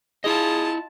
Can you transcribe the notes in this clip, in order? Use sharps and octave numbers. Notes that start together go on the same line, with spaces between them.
E4 F4 G#4 D#5 A5